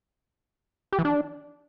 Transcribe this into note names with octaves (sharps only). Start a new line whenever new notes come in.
G4
E3
D4